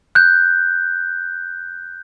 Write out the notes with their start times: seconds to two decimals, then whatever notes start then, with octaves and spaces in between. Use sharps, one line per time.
0.15 F#6 G6